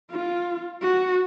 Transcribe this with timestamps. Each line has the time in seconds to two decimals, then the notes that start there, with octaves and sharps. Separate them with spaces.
0.11 F4
0.82 F#4